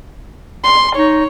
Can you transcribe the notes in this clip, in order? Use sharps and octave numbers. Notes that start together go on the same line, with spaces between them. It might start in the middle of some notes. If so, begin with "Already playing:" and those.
C6
D#4 C#5